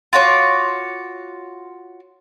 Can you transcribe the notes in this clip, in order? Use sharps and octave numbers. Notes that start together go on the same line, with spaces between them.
F4 F#4 C#5 D6